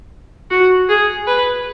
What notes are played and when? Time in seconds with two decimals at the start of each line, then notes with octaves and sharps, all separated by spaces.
0.50 F#4
0.89 G#4
1.27 B4